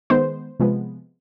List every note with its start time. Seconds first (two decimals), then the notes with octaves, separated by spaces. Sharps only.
0.10 D#3 G#3 B3 C5
0.60 C3 F3 G#3 B3